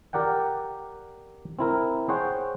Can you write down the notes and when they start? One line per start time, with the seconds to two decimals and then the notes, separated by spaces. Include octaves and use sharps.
0.13 G4 A#4 D5 F#5 G5
1.59 C4 E4 A#4
2.09 G#4 C5 C#5 F#5 G5